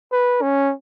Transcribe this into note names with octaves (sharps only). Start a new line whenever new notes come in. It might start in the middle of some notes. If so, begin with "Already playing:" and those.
B4
C#4